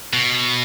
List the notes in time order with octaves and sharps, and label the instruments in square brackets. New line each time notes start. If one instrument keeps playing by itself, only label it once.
[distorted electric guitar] B2